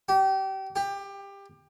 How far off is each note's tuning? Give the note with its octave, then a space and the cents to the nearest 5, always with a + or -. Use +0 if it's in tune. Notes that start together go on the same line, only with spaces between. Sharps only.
G4 -30
G4 +20